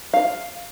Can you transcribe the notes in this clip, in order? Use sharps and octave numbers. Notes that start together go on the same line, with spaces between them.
F5